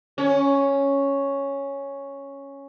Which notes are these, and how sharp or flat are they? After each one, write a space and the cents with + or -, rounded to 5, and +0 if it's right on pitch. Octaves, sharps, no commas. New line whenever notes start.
C#4 +0